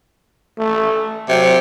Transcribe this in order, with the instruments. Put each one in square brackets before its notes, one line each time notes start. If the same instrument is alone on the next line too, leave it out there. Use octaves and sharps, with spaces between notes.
[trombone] A3
[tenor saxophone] C3 [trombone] F#3